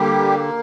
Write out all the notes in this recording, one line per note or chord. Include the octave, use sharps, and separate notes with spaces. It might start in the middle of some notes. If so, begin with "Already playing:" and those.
Already playing: D3 G3 A#3 G4